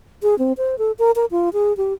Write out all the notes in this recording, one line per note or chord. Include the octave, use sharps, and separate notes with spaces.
G#4
C4
C5
A4
A#4
A#4
F4
G#4
G4